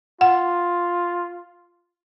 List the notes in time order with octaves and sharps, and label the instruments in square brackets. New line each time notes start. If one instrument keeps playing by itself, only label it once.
[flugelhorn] F4 [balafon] F#5